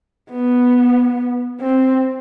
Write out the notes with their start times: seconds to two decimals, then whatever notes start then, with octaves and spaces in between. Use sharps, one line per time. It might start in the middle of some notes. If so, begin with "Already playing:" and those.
0.31 B3
1.61 C4